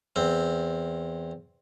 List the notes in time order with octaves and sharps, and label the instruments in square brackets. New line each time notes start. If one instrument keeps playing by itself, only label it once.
[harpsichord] E2 C4